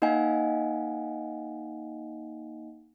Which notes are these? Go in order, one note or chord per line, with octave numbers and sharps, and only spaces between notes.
A#3 D#4 D#5 F5 F#5 G#5